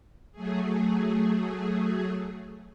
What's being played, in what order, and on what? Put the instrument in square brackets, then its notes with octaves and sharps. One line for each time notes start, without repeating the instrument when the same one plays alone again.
[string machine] F#3 A3 G#4